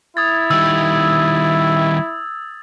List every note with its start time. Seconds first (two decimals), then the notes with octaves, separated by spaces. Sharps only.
0.17 E4 D#6 G#6 A6
0.51 D#3 G3 E6